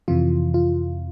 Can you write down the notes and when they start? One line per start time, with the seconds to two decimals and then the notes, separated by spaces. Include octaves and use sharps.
0.08 F2 C3 E3 F4
0.54 F4